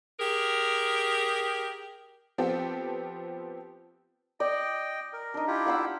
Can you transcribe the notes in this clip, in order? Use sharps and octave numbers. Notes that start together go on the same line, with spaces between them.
G4 G#4 A#4
F3 B3 C4 G4 A4
D5 D#5 G5
A#4
D4 D#4
E4 F4 G4
F5 F#5 E6